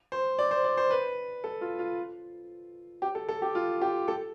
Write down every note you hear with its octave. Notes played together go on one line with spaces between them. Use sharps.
C5
D5
C5
D5
C5
B4
A4
F4
F4
G4
A4
A4
G4
F4
G4
A4